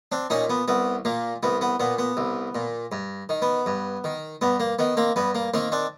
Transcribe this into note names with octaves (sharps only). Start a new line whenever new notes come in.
C4 D4
A#2 C#4 D#4
B3
C2 B3
A#2 A#3
C2 B3
B3
A#2 B3
B3
C2
A#2
G2
D#3
B3
G2
D#3
G2 B3
A#3
D#3 B3
A#3 C4
G2 B3
A#3
D#3 A#3 C4
C4 D4